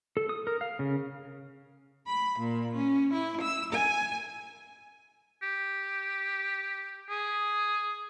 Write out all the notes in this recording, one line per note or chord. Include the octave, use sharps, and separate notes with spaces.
A4
D#6
A#4
F5
C#3
B5
A#2
C#4
E4
E6
G#5
G4
G#4